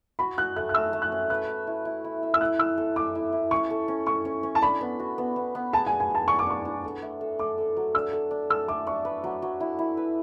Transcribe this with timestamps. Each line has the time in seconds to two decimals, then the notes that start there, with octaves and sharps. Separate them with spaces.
0.19 F#4 B5
0.38 F#4 F#6
0.56 A3 F#6
0.69 F#6
0.74 A3 E6
0.93 A3
1.02 F#6
1.12 C#4
1.30 B4 F#6
1.49 E5
1.67 E4
1.85 E4
2.04 E4
2.23 E5
2.34 E6
2.41 E4 F#6
2.59 E4 E6
2.78 A4
2.96 E5 D6
3.15 E4
3.32 E4
3.51 C#4 C#6
3.70 A4
3.88 C#4
4.06 C#4 C#6
4.25 C#4
4.43 C#4
4.55 A5
4.62 D4 B5
4.81 B3
4.99 F#4
5.18 B3
5.36 B3
5.55 B3
5.73 G#4 A5
5.87 G#5
5.91 G#4
6.00 G#5
6.10 G#4 A5
6.28 D5 C#6
6.39 D6
6.46 D4 C#6
6.65 D4
6.84 A4
7.02 A3
7.21 A4
7.39 A4 D6
7.58 A4
7.77 F#3
7.95 D4 E6
8.13 A4
8.31 D4
8.50 A4 E6
8.68 A3 D6
8.87 D4 C#6
9.05 B4
9.24 F#3
9.42 F#3
9.60 E4
9.79 E4
9.97 B4